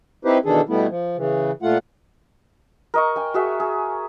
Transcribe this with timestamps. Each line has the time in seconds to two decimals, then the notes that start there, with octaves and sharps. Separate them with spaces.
0.25 C4 D#4 E4 G4 B4 C5
0.45 B2 D#3 E3 D4 G#4 A4
0.69 B2 G3 A3 B3 E4
0.89 F3
1.17 C#3 E3
1.63 A#2 A3 F4 F#5
2.94 A#4 D#5 C#6
3.16 G5 G#5
3.34 F#4 G#4 E5
3.60 G#4